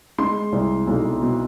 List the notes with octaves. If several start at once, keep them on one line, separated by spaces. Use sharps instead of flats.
G#3 C6
C2
B1
B2